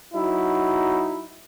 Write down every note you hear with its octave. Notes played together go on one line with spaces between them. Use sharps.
F#3 D#4 E4